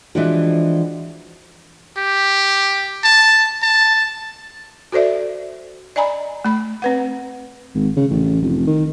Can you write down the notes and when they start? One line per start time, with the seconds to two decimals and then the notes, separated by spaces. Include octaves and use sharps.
0.15 E3 F3 G#3 D4 F#4
1.97 G4
3.04 A5
3.62 A5
4.92 F#4 A4 C5 D5 E5
5.96 D5 D#5 G#5 A#5 B5
6.45 A3 B5
6.82 C4 B4 F#5
7.75 G#1
7.97 C#3
8.10 A1
8.42 F1
8.67 D#3